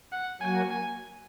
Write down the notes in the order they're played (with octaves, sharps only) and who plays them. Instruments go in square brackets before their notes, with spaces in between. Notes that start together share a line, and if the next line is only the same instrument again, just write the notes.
[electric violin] F#5
[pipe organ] F#3 A#3 F#4 [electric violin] G#5
[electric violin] G#5